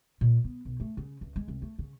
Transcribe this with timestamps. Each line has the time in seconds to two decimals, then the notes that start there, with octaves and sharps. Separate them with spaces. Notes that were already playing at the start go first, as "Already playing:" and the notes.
0.21 A#2
0.44 B3
0.65 B1
0.80 A3
0.97 C#3
1.21 C#2
1.36 G#3
1.48 C2
1.62 A3
1.79 C#3